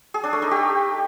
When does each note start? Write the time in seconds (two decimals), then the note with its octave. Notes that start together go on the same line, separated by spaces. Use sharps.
0.14 G#4
0.24 D4
0.33 A3
0.42 D#4
0.51 G4